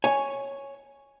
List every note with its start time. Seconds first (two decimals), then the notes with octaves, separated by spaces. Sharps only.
0.04 C#5 G#5